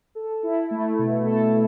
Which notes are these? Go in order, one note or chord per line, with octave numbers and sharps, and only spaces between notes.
A4
E4
A3
B2
A4